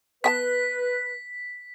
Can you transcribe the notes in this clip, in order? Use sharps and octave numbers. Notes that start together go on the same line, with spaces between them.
B3 B4 G5 A5 B6